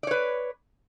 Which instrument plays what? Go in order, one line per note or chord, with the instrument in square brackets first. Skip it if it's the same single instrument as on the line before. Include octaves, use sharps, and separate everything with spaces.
[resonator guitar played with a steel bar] D5
C#5
B4